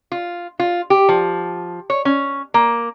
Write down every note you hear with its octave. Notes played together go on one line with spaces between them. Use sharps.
F4
F4
G4
F3
C#5
C#4
A#3